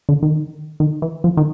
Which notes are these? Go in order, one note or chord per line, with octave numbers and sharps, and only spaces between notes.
D3
D#3
D#3
E3
F3
D#3